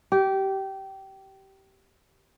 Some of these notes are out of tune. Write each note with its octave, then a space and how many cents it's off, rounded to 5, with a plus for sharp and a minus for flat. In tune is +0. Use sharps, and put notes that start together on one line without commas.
G4 -20